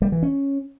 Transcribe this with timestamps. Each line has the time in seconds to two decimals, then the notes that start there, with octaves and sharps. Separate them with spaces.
0.02 G3
0.12 E3
0.23 C#4